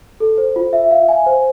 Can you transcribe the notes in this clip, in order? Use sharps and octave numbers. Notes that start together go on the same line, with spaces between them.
A4
C5
F4
E5
F5
G#5
C5